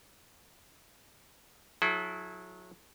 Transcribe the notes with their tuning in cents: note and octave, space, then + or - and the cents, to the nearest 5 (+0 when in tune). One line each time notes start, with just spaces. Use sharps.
F#3 -25 E4 +0 A4 -45